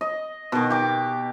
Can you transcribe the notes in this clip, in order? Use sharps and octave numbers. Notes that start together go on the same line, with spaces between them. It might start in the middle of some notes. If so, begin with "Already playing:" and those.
D#5
B2 D#3
G4 D6